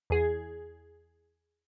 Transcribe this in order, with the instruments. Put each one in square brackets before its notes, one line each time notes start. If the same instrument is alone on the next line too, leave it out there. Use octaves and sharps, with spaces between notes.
[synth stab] E2 G#4